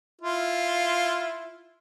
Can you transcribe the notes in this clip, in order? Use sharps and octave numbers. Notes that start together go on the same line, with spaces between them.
E4 F4